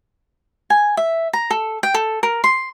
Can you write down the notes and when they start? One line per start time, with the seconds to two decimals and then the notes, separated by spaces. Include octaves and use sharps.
0.70 G#5
0.97 E5
1.33 A#5
1.51 A4
1.83 G5
1.94 A4
2.23 A#4
2.44 C6